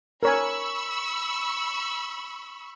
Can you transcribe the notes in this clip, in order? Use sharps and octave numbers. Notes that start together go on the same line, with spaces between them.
A#4 C#5 G#5 B5 C#6 E6